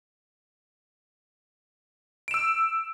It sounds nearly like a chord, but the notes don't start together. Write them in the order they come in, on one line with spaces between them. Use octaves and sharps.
D7 E7 E6